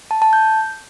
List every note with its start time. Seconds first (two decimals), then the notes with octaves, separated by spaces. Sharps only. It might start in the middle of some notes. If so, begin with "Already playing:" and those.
0.11 A5
0.22 A5
0.33 G6